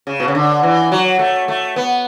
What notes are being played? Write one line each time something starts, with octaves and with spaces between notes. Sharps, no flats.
C#3
B2
C#3
D3
E3
F#3
A3
A3
B3